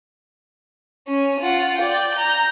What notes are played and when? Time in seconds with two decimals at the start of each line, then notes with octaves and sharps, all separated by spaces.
1.08 C#4
1.41 F4 F#5
1.78 D5 G5
2.15 A#5 G6